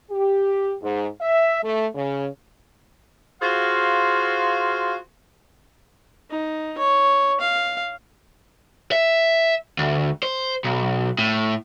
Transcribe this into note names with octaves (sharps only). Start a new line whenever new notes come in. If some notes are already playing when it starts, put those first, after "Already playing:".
G4
G#2
E5
A3
C#3
F4 F#4 G#4 C5 F5
D#4
C#5
F5
E5
D2
C5
B1
A2